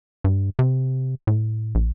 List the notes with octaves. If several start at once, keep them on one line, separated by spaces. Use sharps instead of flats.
G2
C3
A2
A#1